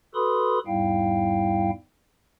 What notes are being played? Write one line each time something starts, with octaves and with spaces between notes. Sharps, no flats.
F#4 A4 B4 B5 C6 D#6
E2 G#2 G3 E4 F5 G5